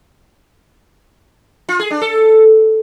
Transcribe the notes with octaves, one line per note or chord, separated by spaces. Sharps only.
F4
G#4
D4
A4